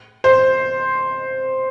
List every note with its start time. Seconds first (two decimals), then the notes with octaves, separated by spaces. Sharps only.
0.24 C5